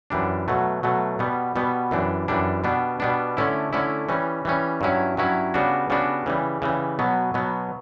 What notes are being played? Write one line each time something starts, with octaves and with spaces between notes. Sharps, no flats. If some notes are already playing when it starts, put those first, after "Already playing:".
F#2 E3 G3 D4
B2 F#3 A3
B2 F#3 A3
B2 G3 B3
B2 G3 B3
F#2 E3 G3 D4
F#2 E3 G3 D4
B2 G3 B3 D4
B2 G3 B3 D4
D3 A3 C#4 E4
D3 A3 C#4 E4
E3 G3 C#4
E3 G3 C#4
G2 F#3 C#4 E4
G2 F#3 C#4 E4
C#3 G3 B3 D4 F#4
C#3 G3 B3 D4 F#4
C#3 E3 G3
C#3 E3 G3
B2 F#3 B3
B2 F#3 B3